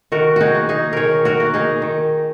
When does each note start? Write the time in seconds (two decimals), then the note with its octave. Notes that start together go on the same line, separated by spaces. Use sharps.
0.12 D#3 F#4 A#4
0.36 D#4 F#4 G#4
0.55 A#3
0.69 D#4 G#4
0.93 D#3 G#4 A#4 C#5
1.25 F#4 A#4
1.40 A#3
1.54 D#4 G#4
1.82 D#3